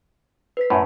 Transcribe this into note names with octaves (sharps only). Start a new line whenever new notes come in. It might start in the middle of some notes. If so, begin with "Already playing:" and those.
B4 B6
F#2 A2